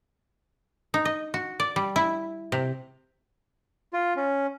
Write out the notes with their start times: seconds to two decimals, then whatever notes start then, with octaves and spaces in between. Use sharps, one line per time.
0.94 D#4
1.05 D#5
1.34 F#4
1.60 D5
1.76 G3
1.96 E4
2.52 C3
3.93 F4
4.17 C#4